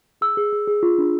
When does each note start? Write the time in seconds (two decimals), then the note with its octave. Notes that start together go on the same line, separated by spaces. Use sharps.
0.21 G#4 E6
0.37 G#4
0.53 G#4
0.67 G#4
0.83 F4
0.98 D4